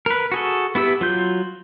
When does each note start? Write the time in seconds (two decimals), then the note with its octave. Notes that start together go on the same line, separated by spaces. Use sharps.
0.06 A#4 B4
0.32 F#4 G#4 A4
0.75 B3 E4 G4 E6
1.01 F#3 F4 G6